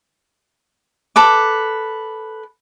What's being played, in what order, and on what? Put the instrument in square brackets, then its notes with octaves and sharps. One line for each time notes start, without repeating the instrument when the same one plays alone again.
[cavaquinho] A4 B4 D6